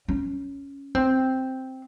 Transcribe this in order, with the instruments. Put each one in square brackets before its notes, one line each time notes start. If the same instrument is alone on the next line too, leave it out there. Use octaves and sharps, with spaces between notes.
[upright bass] C#4
C4